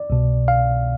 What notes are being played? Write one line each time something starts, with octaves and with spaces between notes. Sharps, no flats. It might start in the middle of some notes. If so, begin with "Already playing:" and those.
Already playing: D5
C2 B2
F5